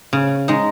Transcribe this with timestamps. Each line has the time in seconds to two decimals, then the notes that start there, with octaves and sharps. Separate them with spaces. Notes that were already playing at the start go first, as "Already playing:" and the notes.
0.13 C#3
0.48 G#3 D#4